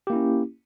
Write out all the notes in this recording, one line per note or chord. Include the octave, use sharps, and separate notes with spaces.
A#3 C#4 E4 G4